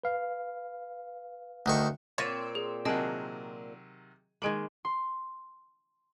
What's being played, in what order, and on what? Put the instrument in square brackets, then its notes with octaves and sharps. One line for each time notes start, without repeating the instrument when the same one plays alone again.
[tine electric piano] B4 F5
[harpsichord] D2 D#3 C#6
[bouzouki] A#2 C4 [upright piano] C#5 [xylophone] A6 A#6 D#7
[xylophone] G#4
[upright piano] C3 D#3 F#3 [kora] G#4 F#5 [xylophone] D#5 A5 D7
[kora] D#3 G#3 A#3 [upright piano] G#6 D7 F#7
[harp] C6